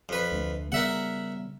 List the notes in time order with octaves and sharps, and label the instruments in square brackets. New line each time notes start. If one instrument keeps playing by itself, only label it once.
[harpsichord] F2 B4
[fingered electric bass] D2 A3
[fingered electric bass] C#3 G3 B3 [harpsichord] A#4 E5 F#5